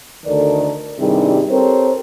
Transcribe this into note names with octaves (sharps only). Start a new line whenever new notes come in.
D2 D#3 A4 A#4 D5
G2 C3 D#3 G3 E4 G#4
C4 G4 A4 A#4 C5 C#5